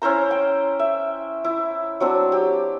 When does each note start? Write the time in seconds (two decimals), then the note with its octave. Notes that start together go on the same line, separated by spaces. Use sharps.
0.02 C#4 E4 C5 A#5
0.31 G5
0.79 E5
1.44 E4
2.00 F#3 C4 D4
2.32 G4